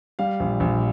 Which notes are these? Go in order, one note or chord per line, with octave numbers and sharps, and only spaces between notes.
G3 F5
A#1
A#1